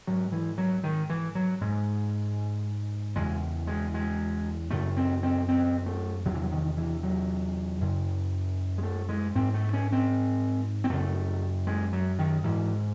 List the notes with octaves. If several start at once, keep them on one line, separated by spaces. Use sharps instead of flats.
G#2 F#3
E3
F#3
D#3
E3
F#3
G#2 G#3
E2 C#3 G#3
G#3
G#3
F#2 C#3 A3
C4
C4
C4
A3
E2 C3 F#3
E3
F#3
D#3
E3
F#3
F#2 C#3
G#3
A3
G#3
G#2 C4
A3
C#4
C4
C4
F#2 C#3 A3
G#3
F#3
D#3
G#2 E3